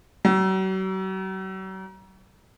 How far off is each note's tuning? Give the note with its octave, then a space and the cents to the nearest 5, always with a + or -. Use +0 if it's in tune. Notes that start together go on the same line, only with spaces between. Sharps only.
F#3 +40